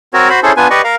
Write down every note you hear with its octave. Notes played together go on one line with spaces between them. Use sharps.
C4 F#4 A#4 C#5
F#4 C5 B5
C#4 E4 G#4 A4 C5
B3 D4 F4 B4 G#5
G4 B4 D5 D#5 C#6
A#4 F5